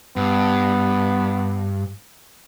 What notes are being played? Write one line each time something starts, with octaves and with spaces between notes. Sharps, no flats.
G2 B3